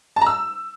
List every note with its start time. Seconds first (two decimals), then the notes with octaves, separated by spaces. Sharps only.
0.16 A5
0.21 A#5
0.27 E6